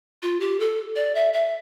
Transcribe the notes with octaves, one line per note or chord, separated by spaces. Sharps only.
F4
G4
A4
D5
E5
E5